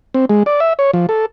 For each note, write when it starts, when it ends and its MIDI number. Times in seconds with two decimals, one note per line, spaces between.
0.14 0.25 60
0.30 0.43 56
0.46 0.60 74
0.60 0.73 76
0.79 0.91 73
0.94 1.06 53
1.09 1.26 69